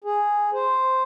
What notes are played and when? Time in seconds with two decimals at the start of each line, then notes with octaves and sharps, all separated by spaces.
0.04 G#4
0.53 C5